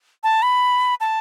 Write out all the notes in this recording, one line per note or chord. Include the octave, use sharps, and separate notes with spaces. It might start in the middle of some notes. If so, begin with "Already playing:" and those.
A5
B5
A5